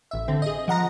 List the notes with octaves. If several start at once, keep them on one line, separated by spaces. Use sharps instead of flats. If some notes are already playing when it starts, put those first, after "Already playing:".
A1 E5
D3 C4
G#4 D#5
F3 F#5 A#5 A#6